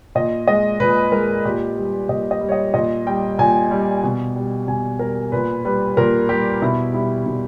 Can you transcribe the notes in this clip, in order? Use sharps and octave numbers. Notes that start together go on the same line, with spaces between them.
A#2 D#5
G#3 D#5
A#2 B4
G#3 A#4
A#2 G4
G3
A#2 D#5
D#5
G3
C#5
D#5
A#2 D#5
G3 G5
A#2 G#5
G3
B2
G3
B2 G#5
G3 A#4
A#2 B4
G3 B4
A#2 A#4
G3 G4
B2 E4
G3 E4
B2 E4